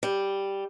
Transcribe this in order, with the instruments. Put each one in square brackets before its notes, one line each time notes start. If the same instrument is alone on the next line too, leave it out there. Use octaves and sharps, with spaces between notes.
[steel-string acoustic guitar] G3